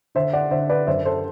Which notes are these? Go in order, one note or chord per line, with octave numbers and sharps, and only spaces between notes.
D3 C5 E5
D5 F#5
D3 C5 E5
B4 D5
F#2 C5 E5
A4 C5